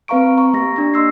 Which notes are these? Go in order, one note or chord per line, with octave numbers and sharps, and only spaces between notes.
C4 B4 F5 A#5 C#6 D7
A#5 C#6
A#3 G4 A#6
D4 G4 A#6
D#5 C6 E6 C7